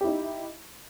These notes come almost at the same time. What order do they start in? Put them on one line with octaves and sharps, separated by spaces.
G4 E4 D#4